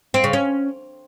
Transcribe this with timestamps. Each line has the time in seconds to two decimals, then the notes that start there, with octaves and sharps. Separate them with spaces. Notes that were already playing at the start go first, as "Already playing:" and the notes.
0.14 C4
0.24 C#3
0.33 C#4